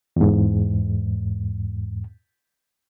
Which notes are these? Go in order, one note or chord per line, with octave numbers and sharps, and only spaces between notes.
E2 G#2